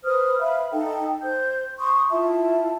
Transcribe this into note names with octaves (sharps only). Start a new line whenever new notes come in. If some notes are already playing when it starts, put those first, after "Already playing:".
B4 C5 D#6 F6
B4 E5 F5 B5
D#4 A4 G5
C5 G6
C6 C#6 D#6
E4 F4 E5 A5